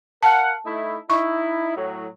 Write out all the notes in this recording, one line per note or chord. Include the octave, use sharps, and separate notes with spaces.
A#4 F5 F#5 A5
A3 D#4 E4
D#4 E4 C#6
A2 F#3